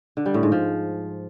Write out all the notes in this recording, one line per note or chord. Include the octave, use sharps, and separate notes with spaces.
D3
G3
A2
G#2
F3